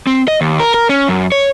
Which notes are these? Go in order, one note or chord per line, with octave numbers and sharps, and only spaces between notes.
C4
D#5
D#2
A#4
A#4
C#4
F#2
C#5